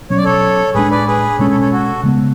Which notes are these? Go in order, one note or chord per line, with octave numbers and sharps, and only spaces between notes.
B2 F#3 C#4 C#5
D5
A4 C#5
A2 G#3 B3 D4 G#4 B4
B4 D5
G#4 B4
B2 G#3 C#4 A4 C#5
A4 C#5
A4 C#5
F#4 A4
C#3 G#3 B3